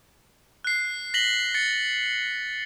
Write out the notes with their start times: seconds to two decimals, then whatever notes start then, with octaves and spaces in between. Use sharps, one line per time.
0.64 F#6 C7
1.14 A#6 B6 F#7 G7
1.54 A6 C#7